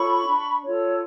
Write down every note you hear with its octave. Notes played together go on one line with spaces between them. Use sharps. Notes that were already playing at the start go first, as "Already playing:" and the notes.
Already playing: F4 A4 C#5 B5 C#6
D4
F4 A4 C#5